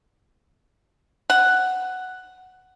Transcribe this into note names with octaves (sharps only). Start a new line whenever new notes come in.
F#5